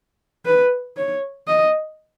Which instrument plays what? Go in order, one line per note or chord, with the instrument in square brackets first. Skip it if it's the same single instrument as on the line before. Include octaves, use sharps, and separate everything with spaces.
[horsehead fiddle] B4
C#5
D#5